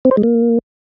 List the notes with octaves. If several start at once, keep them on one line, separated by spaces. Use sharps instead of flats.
C4
C5
G#3
A#3